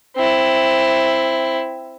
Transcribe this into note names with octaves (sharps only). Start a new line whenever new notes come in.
C4 E4